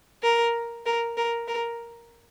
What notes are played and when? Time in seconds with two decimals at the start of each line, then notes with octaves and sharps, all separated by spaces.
0.23 A#4
0.86 A#4
1.17 A#4
1.48 A#4